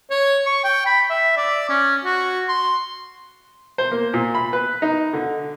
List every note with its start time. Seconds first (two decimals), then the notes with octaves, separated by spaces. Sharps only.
0.10 C#5
0.46 C#6
0.64 G5
0.86 B5
1.10 E5
1.37 D5
1.69 C#4
2.05 F#4
2.49 C6
3.78 C5
3.91 A#3
4.14 A#2
4.35 B5
4.53 B4
4.82 D#4
5.13 D3